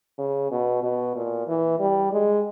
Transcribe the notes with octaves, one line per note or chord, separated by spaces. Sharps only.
C#3
B2
B2
A#2
E3
G3
G#3